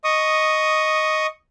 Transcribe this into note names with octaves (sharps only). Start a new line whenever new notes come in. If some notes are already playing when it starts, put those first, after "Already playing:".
D#5 C#6 D#6